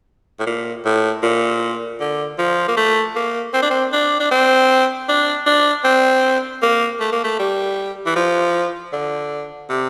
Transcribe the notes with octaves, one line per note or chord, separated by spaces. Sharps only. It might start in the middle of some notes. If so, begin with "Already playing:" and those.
A2
A#2
A2
A#2
D3
F3
A#3
A3
A#3
C4
D4
C4
D4
D4
C4
D4
D4
C4
A#3
A3
A#3
A3
G3
E3
F3
D3
C3